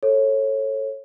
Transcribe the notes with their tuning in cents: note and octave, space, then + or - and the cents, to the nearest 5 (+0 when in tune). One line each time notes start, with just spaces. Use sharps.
A4 +0 C#5 -25